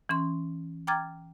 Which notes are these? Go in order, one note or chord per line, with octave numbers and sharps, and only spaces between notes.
E3 C#4 C6
G5 A#5 D6 F6 G#6 A6